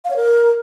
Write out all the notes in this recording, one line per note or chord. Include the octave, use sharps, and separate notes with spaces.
F5
C#5
A#4